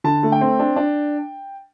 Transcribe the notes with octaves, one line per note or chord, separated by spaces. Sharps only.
D3 A5
A3
G5
C4
D4
D4